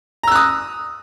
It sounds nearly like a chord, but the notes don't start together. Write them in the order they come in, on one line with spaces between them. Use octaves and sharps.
A#5 E6 F#6 D#6